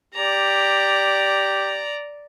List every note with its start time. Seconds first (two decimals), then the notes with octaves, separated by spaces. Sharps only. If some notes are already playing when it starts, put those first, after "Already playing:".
0.15 G4 D5 A#5